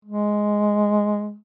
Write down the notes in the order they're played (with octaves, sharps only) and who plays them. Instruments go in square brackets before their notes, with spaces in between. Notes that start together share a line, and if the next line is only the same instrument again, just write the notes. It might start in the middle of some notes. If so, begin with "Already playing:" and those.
[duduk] G#3